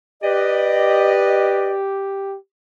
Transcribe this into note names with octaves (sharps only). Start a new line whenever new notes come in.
G4 B4 D5 D#5